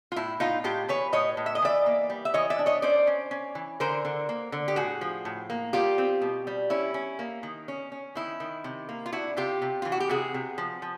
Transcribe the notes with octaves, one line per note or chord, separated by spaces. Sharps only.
F4
A2 E4
A2 D#4 F4
A2 F4 G4
E3 B4 C#5
A2 C#5 D#5
A2
E5
D#5
E3 D5 E5
A#3
G3
E5
E3 C#5 D#5
D5 E5
D4
C#5 D#5
C#4 C5 D5
C#4
C#4
E3
D3 A#4 C5
D3
A#3
D3
G4
A2 F#4 G#4
F3
A2
A#3
G3 F4 G4
C4
B2
G3
C#4 E4
C#4
A#3
D#3
C#4
C#4
D#3 E4
D#3
C3
A#3
F4
D4 E4 F#4
C3 F4 G4
C3
E3 F4
F#4
G4
C3 F#4 G#4
C3
F3
F3